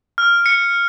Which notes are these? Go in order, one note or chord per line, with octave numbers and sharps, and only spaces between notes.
F6
C#7